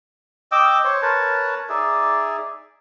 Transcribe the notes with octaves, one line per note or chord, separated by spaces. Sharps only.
D#5 G5 D6 E6
C5 C#5
A#4 B4 C#5 A5
D#4 G#4 D5 E5